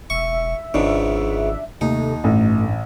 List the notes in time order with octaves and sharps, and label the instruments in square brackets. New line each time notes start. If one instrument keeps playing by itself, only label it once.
[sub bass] E1 [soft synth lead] E5 [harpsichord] C#6
[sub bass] G#1 [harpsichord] C#2 G#2 C#3 [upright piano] D4
[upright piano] D#2 [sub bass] C3 [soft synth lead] A3 [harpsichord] D#4
[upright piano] A1 [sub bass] G2 [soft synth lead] A3